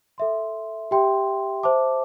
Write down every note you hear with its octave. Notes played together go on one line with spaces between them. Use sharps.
A4 E5 C6
G4 E5 G5 C6
C5 E5 A5 D6